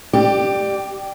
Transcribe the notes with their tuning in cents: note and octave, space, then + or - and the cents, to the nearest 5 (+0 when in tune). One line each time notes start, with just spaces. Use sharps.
G4 +0 D5 +20